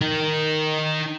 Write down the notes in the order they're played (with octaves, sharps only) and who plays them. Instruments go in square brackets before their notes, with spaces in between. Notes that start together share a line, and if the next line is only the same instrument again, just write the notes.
[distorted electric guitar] D#4 A#4